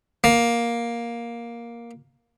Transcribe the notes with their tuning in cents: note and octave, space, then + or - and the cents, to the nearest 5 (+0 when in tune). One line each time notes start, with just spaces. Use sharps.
A#3 +10